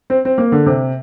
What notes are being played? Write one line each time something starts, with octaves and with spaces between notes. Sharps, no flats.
C4
C4
A#3
D3
C3